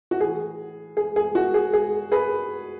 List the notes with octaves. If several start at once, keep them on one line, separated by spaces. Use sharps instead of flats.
F#4
A2 E3 G#4
G#4
G#4
F#4
G#4
G#4
G#4 B4